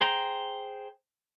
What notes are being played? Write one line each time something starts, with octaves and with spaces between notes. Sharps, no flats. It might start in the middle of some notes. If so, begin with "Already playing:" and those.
G#4 C5 G5 A#5